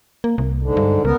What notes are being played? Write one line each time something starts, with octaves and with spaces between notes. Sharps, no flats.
A#3
C2
G#2 D3
G2
C#2 B3 A#4